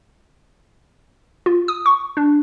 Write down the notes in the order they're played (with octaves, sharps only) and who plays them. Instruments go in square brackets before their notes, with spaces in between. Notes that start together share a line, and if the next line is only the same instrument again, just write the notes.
[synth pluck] F4
D#6
C#6
D4